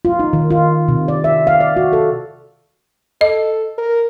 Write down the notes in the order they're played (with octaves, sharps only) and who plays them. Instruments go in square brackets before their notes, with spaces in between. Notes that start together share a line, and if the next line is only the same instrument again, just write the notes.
[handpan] F4
D#4
D#3
F4
C3
D5
E5
F5
D5
F#4
A4
[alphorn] A4 [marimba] D#5
[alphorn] A#4